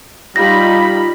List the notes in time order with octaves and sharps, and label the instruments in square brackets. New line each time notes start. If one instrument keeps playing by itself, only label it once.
[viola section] G3 D#4 B5 [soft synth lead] F4 [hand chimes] A#6